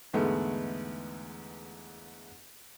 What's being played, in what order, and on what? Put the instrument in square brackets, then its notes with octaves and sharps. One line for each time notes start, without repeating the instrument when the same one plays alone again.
[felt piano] E2 G#2 D3 G#3 A3 B3